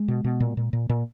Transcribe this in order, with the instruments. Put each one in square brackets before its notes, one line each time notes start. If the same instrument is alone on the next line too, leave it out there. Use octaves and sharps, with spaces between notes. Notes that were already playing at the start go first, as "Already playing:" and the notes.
Already playing: [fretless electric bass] G#3
B2
B2
A#2
A#2
A#2
A#2